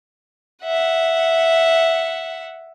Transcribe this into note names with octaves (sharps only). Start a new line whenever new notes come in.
E5 F#5